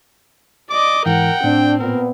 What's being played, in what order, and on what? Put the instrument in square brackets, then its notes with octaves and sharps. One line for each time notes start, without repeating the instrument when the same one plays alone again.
[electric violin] D5 D#5 [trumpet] D6
[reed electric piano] G#2 E3 [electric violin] A#4 F#5 [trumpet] G5
[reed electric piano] A2 [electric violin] C4 [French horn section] D4
[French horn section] A#2 B3 [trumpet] A#4